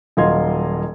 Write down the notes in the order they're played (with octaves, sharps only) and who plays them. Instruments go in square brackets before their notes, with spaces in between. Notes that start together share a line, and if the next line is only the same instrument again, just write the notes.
[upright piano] D#1 F#3 D#5 F5 C6 G#6